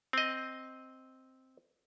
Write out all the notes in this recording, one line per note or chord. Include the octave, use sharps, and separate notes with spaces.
C4 D#5